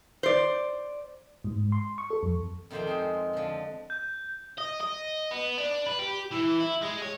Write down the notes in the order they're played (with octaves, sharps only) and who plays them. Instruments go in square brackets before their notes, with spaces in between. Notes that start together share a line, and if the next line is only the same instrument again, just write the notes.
[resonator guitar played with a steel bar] C5 D5
[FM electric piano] G#2
C6
C#6
A4
F2
[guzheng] F2 D#3 F3 C5 D5 G5
G#3 G#4 C5
D3 F3
[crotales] G6
[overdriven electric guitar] D#5
D#5
B3
D4
B4
G4
E3
E4
G#3
C#5